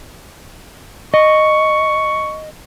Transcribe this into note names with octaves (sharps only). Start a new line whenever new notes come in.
D#5 C#6